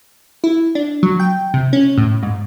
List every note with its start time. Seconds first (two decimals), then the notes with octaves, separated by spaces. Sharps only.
0.44 E4
0.75 D4
1.03 F#3
1.20 G5
1.54 C3
1.73 C#4
1.98 A2
2.23 G#2